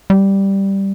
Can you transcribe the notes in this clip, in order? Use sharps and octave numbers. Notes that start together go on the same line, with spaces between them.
G3